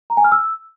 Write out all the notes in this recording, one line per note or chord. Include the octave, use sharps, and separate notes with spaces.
A#5
G#5
F6
E6